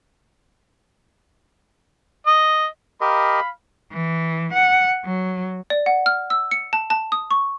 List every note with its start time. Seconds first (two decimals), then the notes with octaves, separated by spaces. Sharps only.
2.27 D#5
3.01 G4 A#4 D#5 F5 B5
3.93 E3
4.54 F#5
5.05 F#3
5.70 D5
5.86 F#5
6.06 F6
6.30 E6
6.51 C#7
6.73 A5
6.90 A5
7.12 D#6
7.31 C#6